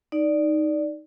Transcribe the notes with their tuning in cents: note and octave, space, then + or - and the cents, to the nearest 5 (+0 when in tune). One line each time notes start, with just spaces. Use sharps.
D#4 +0 D5 +0